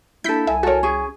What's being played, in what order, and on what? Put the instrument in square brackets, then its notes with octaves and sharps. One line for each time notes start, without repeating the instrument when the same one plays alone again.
[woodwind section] A#3 D4 [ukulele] E4 A4 [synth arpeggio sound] G6 B6
[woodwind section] C2 G#5 [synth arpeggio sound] E5
[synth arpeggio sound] F#4 C#5 [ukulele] A4 A#4
[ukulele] C#4 G#4